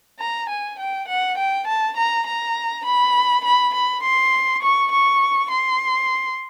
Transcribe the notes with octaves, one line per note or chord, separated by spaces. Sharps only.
A#5
G#5
G5
F#5
G5
A5
A#5
A#5
B5
B5
B5
C6
C#6
C#6
C6